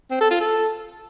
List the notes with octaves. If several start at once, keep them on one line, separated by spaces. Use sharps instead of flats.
C4
A4
F4
A4